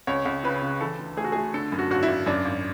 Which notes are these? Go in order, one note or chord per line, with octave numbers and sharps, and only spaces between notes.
C#2 C#5
C#2
C#3 B4
C#3
E3 A4
D2
A3 G#4
F#4
A3 G#4
D3 A4
F#2
F#4
G#1 F#4
E4
G#1
F#2 D4
G#1